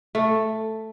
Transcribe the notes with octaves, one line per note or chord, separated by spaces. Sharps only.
A3